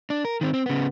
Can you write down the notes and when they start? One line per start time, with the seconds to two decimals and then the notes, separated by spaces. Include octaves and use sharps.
0.10 D4
0.25 A#4
0.41 D#3 C4
0.54 C4
0.66 C#3 B3